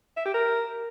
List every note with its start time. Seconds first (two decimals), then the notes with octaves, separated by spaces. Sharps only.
0.17 E5
0.25 G4
0.34 A#4